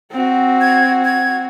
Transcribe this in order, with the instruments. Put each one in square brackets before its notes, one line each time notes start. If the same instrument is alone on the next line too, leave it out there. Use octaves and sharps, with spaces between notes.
[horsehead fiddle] C4 F#4
[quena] G#6
G#6